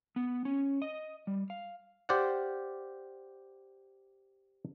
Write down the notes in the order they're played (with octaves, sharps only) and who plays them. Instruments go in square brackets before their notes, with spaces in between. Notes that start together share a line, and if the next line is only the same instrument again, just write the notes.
[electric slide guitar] B3
C#4
D#5
G3
F5
[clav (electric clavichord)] G4 C5 D5 F5 F#5